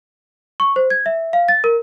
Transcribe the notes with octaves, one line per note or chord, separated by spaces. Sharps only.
C#6
C5
G#6
E5
F5
A6
A#4